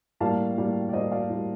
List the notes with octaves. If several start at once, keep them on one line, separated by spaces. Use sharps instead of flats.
A2 G3 A#3 F5 A5
A2 G3 A#3
D5
A2 G3 A#3 C5 D#5
D5 F5
A2 G3 A#3